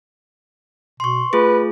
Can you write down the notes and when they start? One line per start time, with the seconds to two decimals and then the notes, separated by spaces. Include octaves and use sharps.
1.00 B2 C6 C#6
1.33 A3 F4 G#4 B4